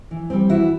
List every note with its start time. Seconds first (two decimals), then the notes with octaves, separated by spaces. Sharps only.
0.11 E3
0.30 G3 C4
0.49 E3 E4 F#4